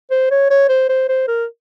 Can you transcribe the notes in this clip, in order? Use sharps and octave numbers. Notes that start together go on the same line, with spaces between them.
C5
C#5
C#5
C5
C5
C5
A#4